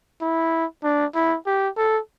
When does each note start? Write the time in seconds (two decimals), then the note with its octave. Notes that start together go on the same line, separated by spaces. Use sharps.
0.21 E4
0.84 D4
1.15 E4
1.47 G4
1.77 A4